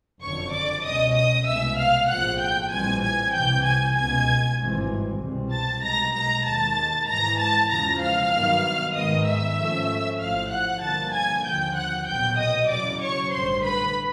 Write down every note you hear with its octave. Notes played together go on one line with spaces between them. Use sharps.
F#1 F2 D3 C#5 C#6
D5 D6
C#2 B2 G#3 C#4 D#5 D#6
D#5 D#6
C2 B2 G#3 B3 E5 E6
F5 F6
A#1 A2 F3 F#5 F#6
G5 G6
A#1 A2 E3 G3 C4 G#5 G#6
G#5 G#6
C2 C3 E3 G5 G6
G#5 G#6
C#2 B2 G#3 B3 G#5 G#6
G#1 G2 E3 G#3 C4
C2 B2 G3 C4
A5 A6
B1 B2 G#3 A#5 A#6
A#5 A#6
D#2 D#3 G#3 A5 A6
G#2 E3 G#3 A#5 A#6
A5 A6
E2 C#3 F3 G#3 A#5 A#6
F5 F6
G2 D#3 F#3 B3
G#2 D#3 G#3 B3 D#5 D#6
E5 E6
G#2 F3 A3 C#4
A1 A2 F3 F5 F6
F#5 F#6
G2 D3 F3 A#3 A5 A6
G#5 G#6
D#2 D3 F3 G5 G6
F#5 F#6
B1 A#2 F#3 B3 G5 G6
D#5 D#6
E2 C#3 F#3 D5 D6
C#5 C#6
A1 G2 D3 C5 C6
B4 B5